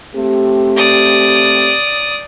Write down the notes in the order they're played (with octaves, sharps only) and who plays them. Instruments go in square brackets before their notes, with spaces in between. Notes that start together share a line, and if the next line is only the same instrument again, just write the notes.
[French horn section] A3 C4 G4
[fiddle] D5 D#6